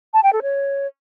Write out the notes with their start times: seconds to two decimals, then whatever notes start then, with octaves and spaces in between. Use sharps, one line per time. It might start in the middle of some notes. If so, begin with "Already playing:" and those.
0.14 A5
0.23 G5
0.33 A4
0.42 C#5